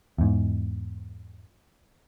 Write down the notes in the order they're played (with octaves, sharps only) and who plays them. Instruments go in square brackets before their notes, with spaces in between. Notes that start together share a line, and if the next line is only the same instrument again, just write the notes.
[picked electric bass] E2 G#2